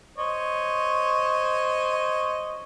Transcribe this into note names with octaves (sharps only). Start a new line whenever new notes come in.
C5 C#5 D#5